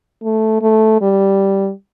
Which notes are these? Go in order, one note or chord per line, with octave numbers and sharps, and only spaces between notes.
A3
A3
G3